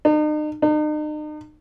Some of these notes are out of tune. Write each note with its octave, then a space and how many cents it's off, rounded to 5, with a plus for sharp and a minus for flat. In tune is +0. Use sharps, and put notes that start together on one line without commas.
D#4 -40
D#4 -40